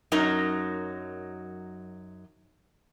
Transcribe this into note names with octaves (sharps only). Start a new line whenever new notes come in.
F#2 F#3 D#4 A#4